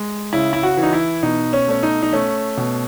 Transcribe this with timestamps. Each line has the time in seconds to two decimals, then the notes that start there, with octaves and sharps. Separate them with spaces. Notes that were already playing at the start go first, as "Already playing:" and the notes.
Already playing: G#3
0.33 C#3 E4
0.53 E4
0.63 F#4
0.77 E3
0.83 D#4
0.93 E4
1.23 B2 D#4
1.53 C#4
1.68 A3 C#4
1.83 D#4
2.03 D#4
2.12 A3 C#4
2.57 B2